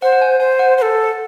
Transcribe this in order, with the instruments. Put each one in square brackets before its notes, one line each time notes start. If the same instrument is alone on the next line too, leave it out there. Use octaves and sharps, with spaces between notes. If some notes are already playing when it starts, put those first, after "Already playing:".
[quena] C5 [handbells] F#5
[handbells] F#5
G#5
[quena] C5 [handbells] G#5
[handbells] F#5
[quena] C5
A4